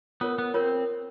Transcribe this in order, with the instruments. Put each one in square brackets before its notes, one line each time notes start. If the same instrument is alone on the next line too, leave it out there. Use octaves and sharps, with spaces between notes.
[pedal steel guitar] B3 [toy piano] F4 A#4 C#5
[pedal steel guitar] B3
[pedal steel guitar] C4 [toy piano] F4 A#4 C#5